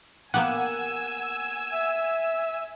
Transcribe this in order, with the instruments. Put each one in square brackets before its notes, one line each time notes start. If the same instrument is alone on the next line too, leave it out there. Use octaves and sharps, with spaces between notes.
[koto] A#3 B3 G4 [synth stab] F#5 [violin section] G#5 E6
[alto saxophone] E5